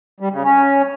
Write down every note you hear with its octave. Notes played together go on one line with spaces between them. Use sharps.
G3
C#3
C#4